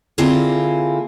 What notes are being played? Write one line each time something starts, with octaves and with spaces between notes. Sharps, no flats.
D3 A#3 C4 E4 F4 G#4